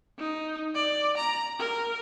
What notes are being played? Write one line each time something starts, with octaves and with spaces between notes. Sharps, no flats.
D#4
D5
A#5
A#4